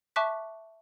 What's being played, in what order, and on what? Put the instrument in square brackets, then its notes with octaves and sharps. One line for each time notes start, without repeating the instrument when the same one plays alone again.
[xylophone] E5 A5 C#6 D6 F#6 B6